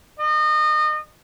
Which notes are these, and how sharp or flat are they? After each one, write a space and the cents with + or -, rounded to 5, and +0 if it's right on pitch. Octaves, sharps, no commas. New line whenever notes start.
D#5 -30